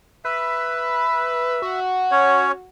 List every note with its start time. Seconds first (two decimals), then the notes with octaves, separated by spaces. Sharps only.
0.25 B4 E5
1.62 F#4
2.11 C#4 C#5